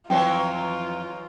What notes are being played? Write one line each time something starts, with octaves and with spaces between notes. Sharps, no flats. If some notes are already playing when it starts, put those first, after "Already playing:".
F2 D#3 E3 F#3 F4 G5